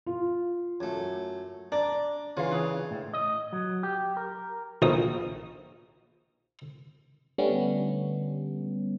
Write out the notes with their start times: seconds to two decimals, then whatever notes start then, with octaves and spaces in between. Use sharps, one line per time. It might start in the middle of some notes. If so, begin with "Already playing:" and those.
0.06 F4
0.80 F#2 A3
1.72 D4 D5 A#5
2.37 C#3 E3 F4 F5
2.51 D4 G#4 C#5
2.91 A2
3.14 D#5
3.53 F#3
3.83 G4
4.17 A#4
4.82 A#1 D#6
7.38 D3 G3 A3 B3 C#4